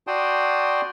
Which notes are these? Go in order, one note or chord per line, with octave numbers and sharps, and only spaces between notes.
F#4 D5 G5 A5 C6 D#6